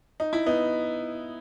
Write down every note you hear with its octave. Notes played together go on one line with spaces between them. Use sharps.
D#4
E4
B3 D#4